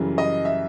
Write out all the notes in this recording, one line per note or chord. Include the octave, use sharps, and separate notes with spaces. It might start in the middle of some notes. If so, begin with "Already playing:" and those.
Already playing: F#2 C#3 E3 G3
D#5
E5